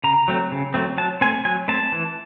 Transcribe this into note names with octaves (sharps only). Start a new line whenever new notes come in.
C#3 A#5
F#3 A3 C4
C#3
F#3 A3 C4
F#3 A5
A3 C4 G#5
F#3 G#5
A3 C4 A5
E3